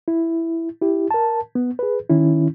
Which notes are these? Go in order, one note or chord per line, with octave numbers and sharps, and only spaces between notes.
E4
E4 G4
A#4 A5
B3
G#4 B4
D#3 C#4 E4